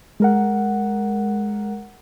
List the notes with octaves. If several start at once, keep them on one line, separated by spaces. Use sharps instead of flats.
G#3 A#4 F#5